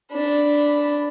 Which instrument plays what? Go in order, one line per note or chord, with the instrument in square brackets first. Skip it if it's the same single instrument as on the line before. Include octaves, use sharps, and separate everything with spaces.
[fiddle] D4 B5